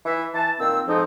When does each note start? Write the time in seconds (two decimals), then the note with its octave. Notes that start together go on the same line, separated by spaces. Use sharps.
0.06 E3 E5
0.34 E3 E5 A5
0.60 A#2 D#3 C4 E6
0.88 F2 G#2 F3 C4 D#4